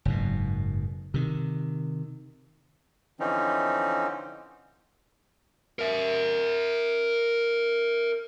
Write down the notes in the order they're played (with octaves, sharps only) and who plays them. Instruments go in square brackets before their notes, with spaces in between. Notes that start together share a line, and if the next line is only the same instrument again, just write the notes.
[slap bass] F#1 G#2 B2
C3 D#3
[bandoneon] D3 E3 F3 C4 C#4 D#4
[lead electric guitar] A#4 E5